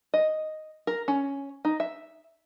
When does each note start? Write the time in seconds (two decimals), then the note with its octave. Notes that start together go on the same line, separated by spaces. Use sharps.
0.14 D#5
0.87 A#4
1.08 C#4
1.65 D#4
1.80 E5